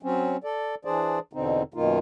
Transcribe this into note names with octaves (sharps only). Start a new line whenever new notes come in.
F#3 C4 C#4
A4 D5
E3 D4 G#4 C5 D5
E2 B2 D3 C4 D#4
F#2 B2 D#3 A#3 D#4 F4